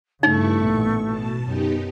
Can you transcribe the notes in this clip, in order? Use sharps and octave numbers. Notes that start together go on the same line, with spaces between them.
G2 C#3 A3 D#4 E4 C#6
A1 A#2 B3 C#6
B2 A5
F#2 B3 D#4 G4